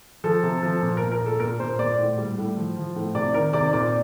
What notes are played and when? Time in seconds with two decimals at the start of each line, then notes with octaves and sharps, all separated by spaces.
0.24 F3 A4
0.43 C3
0.63 F3
0.82 A#2
0.97 A#2 A#4
1.12 A#4
1.21 A#2
1.26 A4
1.40 A#2 A#4
1.60 A#2 C5
1.79 A#2 D5
1.99 A2
2.18 G3
2.38 A2
2.57 F3
2.77 F3
2.96 A2
3.15 C3 D5
3.34 D#3 A#4
3.53 C3 D5
3.73 A#2 D5